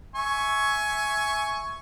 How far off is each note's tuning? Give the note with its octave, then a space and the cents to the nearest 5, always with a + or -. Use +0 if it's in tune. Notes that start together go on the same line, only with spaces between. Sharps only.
E5 +0 G#5 +15 C#6 +0